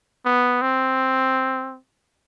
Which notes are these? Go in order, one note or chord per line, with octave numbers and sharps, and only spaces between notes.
B3
C4